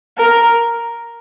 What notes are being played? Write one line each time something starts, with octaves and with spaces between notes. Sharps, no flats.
A#4